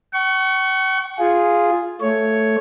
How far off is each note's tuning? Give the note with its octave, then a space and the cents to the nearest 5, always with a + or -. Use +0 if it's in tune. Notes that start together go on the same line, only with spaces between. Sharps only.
F#5 +45 C#6 +5
F4 +0 G#4 +0
A3 +0 C#5 +0